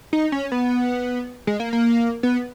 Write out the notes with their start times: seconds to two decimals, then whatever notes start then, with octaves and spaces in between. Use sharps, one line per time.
0.13 D#4
0.32 C#4
0.52 B3
1.47 G#3
1.60 A#3
1.73 A#3
2.23 B3